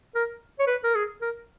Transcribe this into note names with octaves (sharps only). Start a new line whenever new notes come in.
A#4
C#5
B4
A#4
G#4
A#4